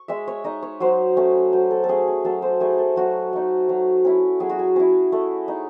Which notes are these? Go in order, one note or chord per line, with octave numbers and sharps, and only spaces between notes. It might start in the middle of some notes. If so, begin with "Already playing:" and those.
Already playing: C#6
G#3 E5
C#5
D#4 D#5
C#5
F#3 C5
A3 C#4
F#3 C5
A4
A4
A3 C#4 G#4
G#4
F#3 A4
C5
A3 D#4 G#4
A4
F#3 F#4
A3 D#4
F#3
C#4 E4
F#3 G#4
F#4
G#4
C#4 E4
A3
D#4